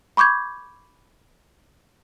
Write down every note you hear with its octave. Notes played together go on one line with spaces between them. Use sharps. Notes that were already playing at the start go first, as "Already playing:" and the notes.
B5 C#6 D6 G6 G#6